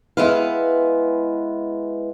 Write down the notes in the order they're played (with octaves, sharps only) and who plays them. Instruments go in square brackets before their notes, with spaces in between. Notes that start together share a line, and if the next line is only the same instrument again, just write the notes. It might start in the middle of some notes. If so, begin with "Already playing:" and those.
[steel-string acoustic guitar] G#3 B3 E4 B4 F5